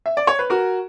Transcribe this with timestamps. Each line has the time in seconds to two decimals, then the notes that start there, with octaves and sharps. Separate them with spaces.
0.06 E5
0.17 D5
0.27 C#5
0.39 B4
0.50 F#4 A#4